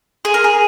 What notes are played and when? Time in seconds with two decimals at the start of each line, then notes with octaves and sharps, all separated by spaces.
0.25 G#4
0.34 A#4
0.44 G#4